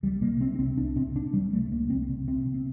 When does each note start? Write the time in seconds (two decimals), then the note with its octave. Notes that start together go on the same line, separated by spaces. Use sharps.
0.03 C2 G3
0.21 C3 A#3
0.40 C3 C4
0.54 D4
0.58 C2 C4
0.77 C2 D4
0.96 C3 C4
1.15 C3 D4
1.33 C3 G3
1.53 C2 A3
1.71 C2 A#3
1.90 C2 C4
2.09 C3
2.27 C3 C4
2.46 C3
2.54 C4